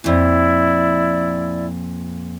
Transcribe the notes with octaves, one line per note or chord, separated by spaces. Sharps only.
F2 A#2 E4 D5